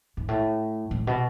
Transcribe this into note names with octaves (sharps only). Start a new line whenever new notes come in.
G#2
A2
A2
B2